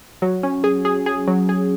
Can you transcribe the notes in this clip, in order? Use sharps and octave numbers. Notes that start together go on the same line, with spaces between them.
F#3
C#4
G#4
G#4
G#4
F#3
G#4